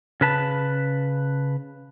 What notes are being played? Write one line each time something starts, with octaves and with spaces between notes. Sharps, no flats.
C#3 B4 A5